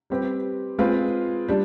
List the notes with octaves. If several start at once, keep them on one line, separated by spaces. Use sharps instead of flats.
G3 C4 G4 B4
G#3 C4 F4 G#4 B4
G3 D4